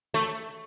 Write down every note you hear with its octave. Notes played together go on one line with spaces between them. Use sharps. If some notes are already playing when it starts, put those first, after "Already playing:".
A3